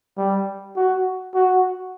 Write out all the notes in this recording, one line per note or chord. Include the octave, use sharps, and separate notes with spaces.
G3
F#4
F#4